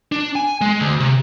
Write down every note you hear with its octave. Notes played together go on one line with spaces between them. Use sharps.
D4
G#5
G#3
D2
C3